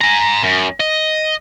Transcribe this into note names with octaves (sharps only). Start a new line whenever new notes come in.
G#5 A#5
F#2
D#5